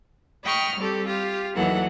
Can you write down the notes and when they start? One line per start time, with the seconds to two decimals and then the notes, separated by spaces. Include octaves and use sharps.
0.44 D#5 G5 B5 C#6 F6
0.77 G3 C4 G4 A4
1.06 F4 G4
1.55 D#2 E3 F#3 A4 F#5